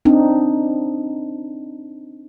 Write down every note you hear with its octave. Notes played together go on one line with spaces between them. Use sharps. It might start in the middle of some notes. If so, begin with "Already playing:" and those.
C4 D4 D#4